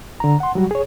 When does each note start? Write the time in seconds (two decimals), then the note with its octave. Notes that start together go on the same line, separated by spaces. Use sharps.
0.20 D3 A#5
0.40 F#5 C6
0.55 F#3 G3 F#4
0.71 G#4 C#5